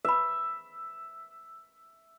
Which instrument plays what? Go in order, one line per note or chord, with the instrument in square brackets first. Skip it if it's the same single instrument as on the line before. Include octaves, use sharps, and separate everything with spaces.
[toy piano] B4 B5 [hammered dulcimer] E5